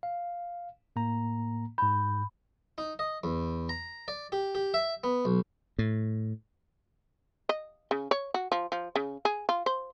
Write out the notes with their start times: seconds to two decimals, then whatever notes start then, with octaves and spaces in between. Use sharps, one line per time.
0.03 F5
0.96 A2 A#3 A#5
1.78 G#2 B5 G6
2.78 D#4
2.99 D#5
3.24 E2
3.69 A#5
4.08 D5
4.32 G4
4.55 G4
4.74 E5
5.04 B3
5.25 B1
5.79 A2
7.49 D#5
7.91 C#3
8.11 C#5
8.34 F#4
8.52 F3
8.72 F3
8.96 C#3
9.25 G#4
9.49 F4
9.66 C5